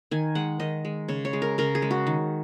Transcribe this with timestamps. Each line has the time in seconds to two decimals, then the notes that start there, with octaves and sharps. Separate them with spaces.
0.11 D#3 G#5
0.35 G#3 F#5
0.60 D#3 D#5
0.85 G#3
1.08 C#3 C#5
1.25 C#5
1.33 G#3
1.42 A#4
1.58 C#3 A#4
1.75 G#4
1.82 G#3
1.91 F#4
2.07 D#3